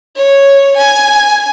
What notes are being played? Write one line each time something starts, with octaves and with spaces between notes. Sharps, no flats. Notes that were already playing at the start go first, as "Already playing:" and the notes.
C#5
G#5